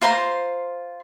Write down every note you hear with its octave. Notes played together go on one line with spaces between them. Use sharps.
F4 C5 A#5 C6